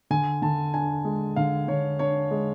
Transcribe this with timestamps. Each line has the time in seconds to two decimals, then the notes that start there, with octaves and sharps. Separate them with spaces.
0.10 D3 G#5
0.42 D3 A5
0.74 D4 G#5
1.05 G#3
1.36 D3 F5
1.68 D3 C#5
1.99 D4 C#5
2.31 G#3